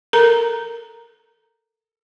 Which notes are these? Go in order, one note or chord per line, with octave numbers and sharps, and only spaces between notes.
A4 A#4 A#5